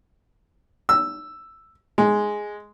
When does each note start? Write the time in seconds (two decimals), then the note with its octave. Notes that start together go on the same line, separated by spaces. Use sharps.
0.89 E6
1.98 G#3